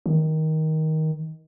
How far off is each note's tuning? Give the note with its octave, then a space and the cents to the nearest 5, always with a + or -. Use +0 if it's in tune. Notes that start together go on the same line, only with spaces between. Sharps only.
D#3 +15